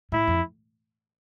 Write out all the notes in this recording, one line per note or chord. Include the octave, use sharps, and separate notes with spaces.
A2 E4
F2